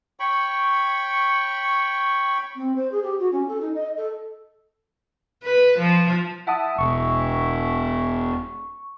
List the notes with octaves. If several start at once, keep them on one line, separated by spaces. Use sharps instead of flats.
C#5 G5 B5 C#6
C4
C5
G#4
G4
F#4
C#4
A4
D#4
D#5
A4
B4
F3
E4 F#5 A5 D#6
E1 C#6